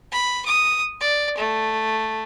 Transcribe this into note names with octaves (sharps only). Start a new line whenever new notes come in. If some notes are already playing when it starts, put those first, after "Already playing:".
B5
D#6
D5
A3